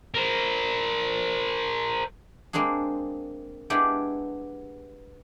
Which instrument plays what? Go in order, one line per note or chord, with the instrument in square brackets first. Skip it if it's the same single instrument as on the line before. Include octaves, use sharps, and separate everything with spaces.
[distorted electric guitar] A#4 C5
[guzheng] G#3 A#3 C4 D4 G#4
G#3 B3 D4 E4 G4